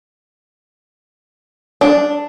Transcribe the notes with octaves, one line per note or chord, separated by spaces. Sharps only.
D4